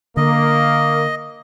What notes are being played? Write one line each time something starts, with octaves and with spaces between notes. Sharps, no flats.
D3 A#3 D#5